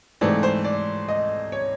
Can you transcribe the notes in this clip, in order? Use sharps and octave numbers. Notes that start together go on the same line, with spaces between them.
G#2 E3 A3 C4 D5
C5
D5
D#5
C#5